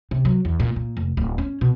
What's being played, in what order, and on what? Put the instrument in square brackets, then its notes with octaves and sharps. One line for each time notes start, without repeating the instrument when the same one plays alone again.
[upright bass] C3
F#3
E2
A#2
A#2
F1
D1
C#4
B2